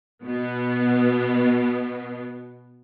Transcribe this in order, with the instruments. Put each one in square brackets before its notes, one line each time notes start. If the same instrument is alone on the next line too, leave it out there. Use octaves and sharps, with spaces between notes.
[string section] B2 B3